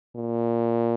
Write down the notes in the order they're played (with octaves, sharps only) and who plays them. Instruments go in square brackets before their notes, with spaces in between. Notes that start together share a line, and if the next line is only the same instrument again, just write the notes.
[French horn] A#2